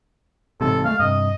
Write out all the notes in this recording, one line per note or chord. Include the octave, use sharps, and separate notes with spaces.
A1 G#2 C3 A4
G#3 A3 F5
G2 C3 D#5